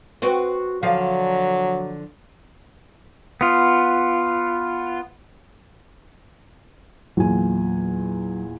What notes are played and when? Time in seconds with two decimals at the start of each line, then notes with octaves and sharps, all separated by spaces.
0.22 C4 F#4 B4
0.83 D3 F3 F#3 F5
3.41 B3 F4
7.17 E2 A#2 F#3 G#5